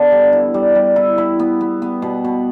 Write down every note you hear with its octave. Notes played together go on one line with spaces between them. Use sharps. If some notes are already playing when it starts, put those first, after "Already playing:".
Already playing: D3 B3
G3
E4
G3
G3
E4
E4
B3
B3
B3
B2
B2